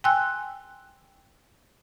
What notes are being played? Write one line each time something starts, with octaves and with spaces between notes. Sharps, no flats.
G5 G#5 C6 E6 F#6